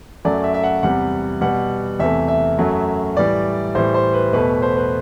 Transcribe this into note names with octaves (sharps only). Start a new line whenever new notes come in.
F#2 F#3 A3 D5
E5
E5
F#5
E2 C3 G3 F#5
B2 G3 F#5
E2 C3 E3 A3 E5
E5
F#2 F#3 A3
A2 E3 G3 D5
A2 E3 G3 C5
C5
B4
E2 B2 A3 B4
C5
B4